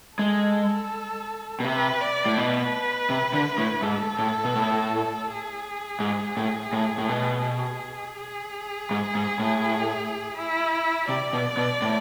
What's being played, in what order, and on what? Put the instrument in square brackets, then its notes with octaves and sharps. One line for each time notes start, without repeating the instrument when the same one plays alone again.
[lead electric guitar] G#3 [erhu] A4
[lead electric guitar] B2
[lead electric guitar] C3 [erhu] B4
[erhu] D5
[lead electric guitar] A2
[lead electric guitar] B2 [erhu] B4
[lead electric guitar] C3
D3
A2
[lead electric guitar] G#2 [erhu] A4
[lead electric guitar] A2
B2
A2
[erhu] G#4
[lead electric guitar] G#2
A2
A2
A2
B2
[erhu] G#4
[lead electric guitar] G#2
G#2
A2
[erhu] E4
[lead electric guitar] C3 [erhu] D5
[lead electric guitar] B2
B2
A2